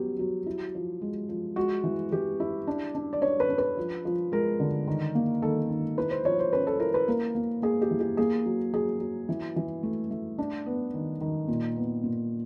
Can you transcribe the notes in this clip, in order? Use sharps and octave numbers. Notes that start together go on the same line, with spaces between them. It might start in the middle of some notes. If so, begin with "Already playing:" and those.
Already playing: F#3 B3 G4
F#3
E4
F3
G#3
F3
G#3 F#4
E3
E3 G4
E4
D4
D4
D5
D4 C#5
B4
D4
B4
F3
F3
G#3 A#4
D3
D#3
A#3
D#3 A4
D#3
E4 B4
C5
F3 C#5
C5
C#4 B4
A4
E4 A#4
B4
A#3 A#4
A#3
A#3 G#4
G4
E3
G4
A#3 G#4
F#3
F#3 G#4
F#3
E3
E3
A3
A3
D4
B3
D#3
D#3
A#2
B3
A#2